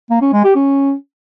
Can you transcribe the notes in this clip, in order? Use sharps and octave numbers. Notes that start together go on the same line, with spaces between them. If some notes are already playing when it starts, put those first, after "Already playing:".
A#3
C#4
G#3
G4
C#4